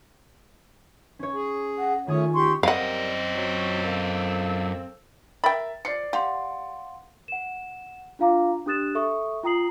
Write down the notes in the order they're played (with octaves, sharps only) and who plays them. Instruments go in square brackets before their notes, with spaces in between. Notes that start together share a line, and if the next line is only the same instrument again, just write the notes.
[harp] C#4 C#5
[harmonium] G#4
[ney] F#5
[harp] D#3 G#4 D#6 [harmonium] A3 C#4 C#5 [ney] F4
[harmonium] D2 [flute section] G4 C6 C#6
[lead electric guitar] F#2 D#5 [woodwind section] G3 A#4 [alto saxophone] C4 [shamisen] F5 F#5
[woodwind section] F#3
A#3 A4 E6
[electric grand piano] A#4 E5 A6 [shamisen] G5 B5
[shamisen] F3 [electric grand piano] D5 C7 C#7
[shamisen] G4 [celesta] F5 F#5 C6
[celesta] F#5 E7
D4 F4 F5 A#5 D6
D4 G4 D#6 F#6 A6 E7
A4 E5 C#6 D#6
F4 G5 A#5 D#6 C7 F#7